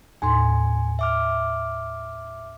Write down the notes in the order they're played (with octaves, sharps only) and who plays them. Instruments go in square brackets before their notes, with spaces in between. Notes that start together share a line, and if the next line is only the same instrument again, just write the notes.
[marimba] D#2 A2 C6 [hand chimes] G#5
[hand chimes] E5 D6 F6